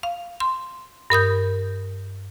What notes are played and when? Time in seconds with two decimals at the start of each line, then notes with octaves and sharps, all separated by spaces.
0.03 F5
0.40 C6
1.10 G2 A#4 D#6 G6